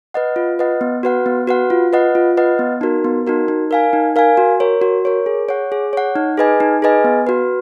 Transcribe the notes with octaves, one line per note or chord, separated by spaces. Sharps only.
B4 D#5 F#5
F4
B4 D#5 F#5
B3
F#4 B4 F#5
B3
F#4 B4 F#5
F4
B4 D#5 F#5
F4
B4 D#5 F#5
B3
D#4 F#4 A#4
B3
D#4 F#4 A#4
D#4
A#4 F5 G#5
D#4
A#4 F5 G#5
F#4
A#4 C#5
F#4
A#4 C#5
G#4
C#5 F#5
G#4
C#5 F#5
D#4
G#4 B4 D#5 G#5
D#4
G#4 B4 D#5 G#5
B3
F#4 B4